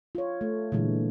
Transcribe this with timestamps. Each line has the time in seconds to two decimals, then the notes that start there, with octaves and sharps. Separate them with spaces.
0.15 F4 C#5
0.41 A3
0.72 A#2 D3 E3 G#3